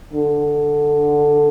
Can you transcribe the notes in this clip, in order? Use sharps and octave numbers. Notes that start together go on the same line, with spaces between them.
D3